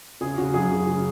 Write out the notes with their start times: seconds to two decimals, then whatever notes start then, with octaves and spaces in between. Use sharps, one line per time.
0.21 C#3 G#4
0.38 C#3 F#4
0.54 F#2 G#4
0.71 C#3
0.87 C#3